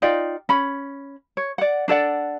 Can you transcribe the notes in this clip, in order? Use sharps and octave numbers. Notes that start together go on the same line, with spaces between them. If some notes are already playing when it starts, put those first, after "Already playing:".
D#4 F4 D5 G5
C#4 B5
C#5
D5 F#5
D4 A4 D5 F#5